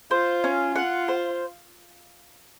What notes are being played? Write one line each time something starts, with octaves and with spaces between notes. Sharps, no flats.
F4 C5
C#4
F4 F#5
C5